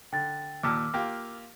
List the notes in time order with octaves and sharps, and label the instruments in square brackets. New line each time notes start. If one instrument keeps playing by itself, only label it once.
[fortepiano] D3 [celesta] G5 A6
[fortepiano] D#2 A#2 A5 [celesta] D6 E6 F6
[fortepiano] A#3 F4 G4